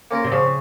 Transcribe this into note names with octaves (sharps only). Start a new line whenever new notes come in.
A#3 C#4 F4 A#4
C3
C#3 F3